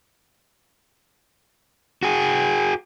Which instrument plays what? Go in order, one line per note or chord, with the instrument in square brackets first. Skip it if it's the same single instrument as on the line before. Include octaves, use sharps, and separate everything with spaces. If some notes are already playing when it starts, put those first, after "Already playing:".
[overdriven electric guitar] F#4 G#4